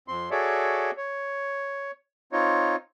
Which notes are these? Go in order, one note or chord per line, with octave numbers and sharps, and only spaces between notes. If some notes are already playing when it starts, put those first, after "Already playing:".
F2 C4 C6
F#4 G#4 A4 C#5 D5 E5
C#5
C4 D#4 F4 C#5